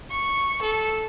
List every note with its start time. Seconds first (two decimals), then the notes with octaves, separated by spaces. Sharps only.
0.11 C#6
0.62 A4